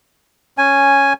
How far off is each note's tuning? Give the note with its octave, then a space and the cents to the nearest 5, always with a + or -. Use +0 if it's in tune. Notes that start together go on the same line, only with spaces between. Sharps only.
C#4 +0 G#5 +0